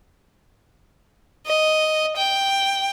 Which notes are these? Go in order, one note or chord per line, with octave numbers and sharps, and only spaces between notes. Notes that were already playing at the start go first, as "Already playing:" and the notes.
D#5
G5